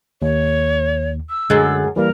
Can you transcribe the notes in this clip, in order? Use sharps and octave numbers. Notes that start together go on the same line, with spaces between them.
D#2 C#5
E6
F#2 D3 G#3 F#6 A6
E3 G3 A#3 A#4